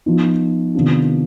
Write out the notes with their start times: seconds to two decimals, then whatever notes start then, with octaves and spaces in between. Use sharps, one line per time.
0.06 F3 B3 D#4
0.75 C3 D#3 B3 D4 F4